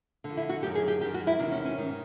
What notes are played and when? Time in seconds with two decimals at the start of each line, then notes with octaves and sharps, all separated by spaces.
0.24 F2 D3
0.37 E4
0.49 F#4
0.63 F#2 D#3 G4
0.75 G#4
0.88 G4
1.00 D#3 G4
1.05 F#2
1.14 F#4
1.27 E4
1.39 E2 C3 D#3 D4
1.52 C#4
1.65 C#4
1.78 G#2 D#3